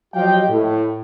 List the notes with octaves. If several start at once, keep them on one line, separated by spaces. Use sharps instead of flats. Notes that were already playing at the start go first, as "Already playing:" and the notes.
F3 F#3 G4 D#5 F5 G5
A2